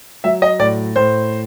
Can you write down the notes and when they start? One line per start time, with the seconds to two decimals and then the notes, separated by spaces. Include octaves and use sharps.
0.24 F#3 E5
0.42 D#5
0.59 A2 D5
0.96 A2 C5